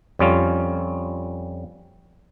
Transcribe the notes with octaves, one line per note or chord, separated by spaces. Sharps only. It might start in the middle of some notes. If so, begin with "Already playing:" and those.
F2 G3 C#4 F4